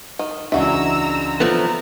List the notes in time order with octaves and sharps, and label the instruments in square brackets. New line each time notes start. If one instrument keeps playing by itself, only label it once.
[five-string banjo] D#3
[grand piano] C#2 E3 D4 [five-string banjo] G#3 F#4 E5 [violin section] A#5 E6
[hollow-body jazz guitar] F3 A3 B3 [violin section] A#5